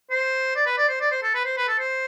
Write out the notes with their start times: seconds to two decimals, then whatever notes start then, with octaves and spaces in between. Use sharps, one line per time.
0.10 C5
0.56 D5
0.66 B4
0.78 D5
0.89 C5
1.01 D5
1.12 C5
1.23 A4
1.35 B4
1.45 C5
1.57 B4
1.68 A4
1.79 C5